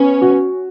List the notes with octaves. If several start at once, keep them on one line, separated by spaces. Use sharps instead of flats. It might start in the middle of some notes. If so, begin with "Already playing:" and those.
Already playing: B3 C#4
F#4